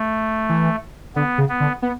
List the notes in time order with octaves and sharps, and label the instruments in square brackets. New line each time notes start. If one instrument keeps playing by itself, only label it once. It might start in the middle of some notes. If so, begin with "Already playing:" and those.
Already playing: [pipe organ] A3
[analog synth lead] E3
[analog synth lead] D3 [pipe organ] B3
[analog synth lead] C#3
[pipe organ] B3
[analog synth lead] D3
B3